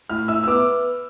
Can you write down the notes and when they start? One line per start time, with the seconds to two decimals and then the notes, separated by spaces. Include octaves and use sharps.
0.10 A2 F6
0.28 E4 E6
0.44 E6
0.47 B3 D6